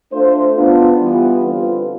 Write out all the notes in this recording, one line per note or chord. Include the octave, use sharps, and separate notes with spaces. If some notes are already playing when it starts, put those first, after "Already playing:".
A3 D4 F4 C5
B3 D4 F4
E3 G3 B3 F4
D3 G3 C4 F4 B4